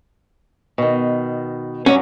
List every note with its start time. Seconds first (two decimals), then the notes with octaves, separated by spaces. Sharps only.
0.78 B2 D#3
1.86 G2 F#3 C#4